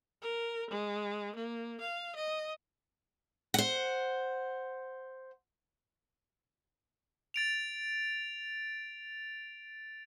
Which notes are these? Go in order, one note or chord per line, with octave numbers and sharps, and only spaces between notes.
A#4
G#3
A#3
F5
D#5
C5 F#5
A6 D7 F7